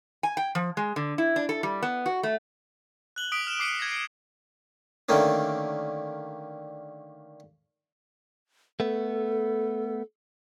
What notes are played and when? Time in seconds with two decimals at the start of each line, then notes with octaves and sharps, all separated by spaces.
0.23 G#5
0.37 G5
0.55 F3
0.77 G#3
0.96 D3
1.18 E4
1.36 D4
1.49 A4
1.63 G3
1.83 B3
2.06 F#4
2.23 A3
3.16 F#6 F#7 G7
3.32 D#6 B6 D7
3.47 F6 E7
3.60 D6 C7 C#7 D#7
3.79 G#6 A#6
3.91 C7 D7
5.09 D3 D#3 A3 A#3 C#4
8.80 A3 B3 A4